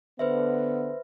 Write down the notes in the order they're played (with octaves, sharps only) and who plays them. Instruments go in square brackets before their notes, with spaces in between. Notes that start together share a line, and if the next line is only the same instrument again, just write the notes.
[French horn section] D3 B3 [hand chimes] B4 C5 E5